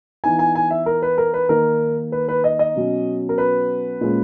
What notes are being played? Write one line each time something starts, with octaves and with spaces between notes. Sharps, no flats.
E3 B3 D#4 G#5
G#5
G#5
E5
A#4
B4
A#4
B4
D#3 A#3 D#4 A#4
B4
B4
D#5
D#5
B2 F#3 C#4
A#4
B4
A#2 G#3 C#4